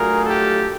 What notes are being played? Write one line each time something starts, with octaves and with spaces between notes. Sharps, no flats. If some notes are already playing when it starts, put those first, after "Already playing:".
Already playing: F#3 A3 D4 F4 G#4 A#4
G4 A4